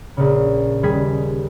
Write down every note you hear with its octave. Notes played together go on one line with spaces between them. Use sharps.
A#1 C#3
D#1 G3 G#4 G#6 B6